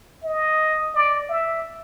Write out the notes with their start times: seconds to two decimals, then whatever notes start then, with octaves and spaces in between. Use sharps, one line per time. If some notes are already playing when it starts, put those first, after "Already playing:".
0.24 D#5
0.94 D5
1.29 E5